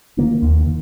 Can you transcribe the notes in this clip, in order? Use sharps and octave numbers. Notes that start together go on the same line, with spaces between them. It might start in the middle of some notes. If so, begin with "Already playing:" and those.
D#3 A#3 C#4
D#2
D#3